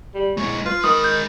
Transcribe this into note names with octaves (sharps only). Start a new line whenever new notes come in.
G3
G#3 E4 C#5
F4 B4
D#3 G#3 B5 D#6
G6